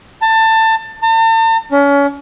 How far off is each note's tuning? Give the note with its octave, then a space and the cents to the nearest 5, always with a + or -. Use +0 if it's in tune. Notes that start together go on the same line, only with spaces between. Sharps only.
A5 +20
A5 +40
C#4 +30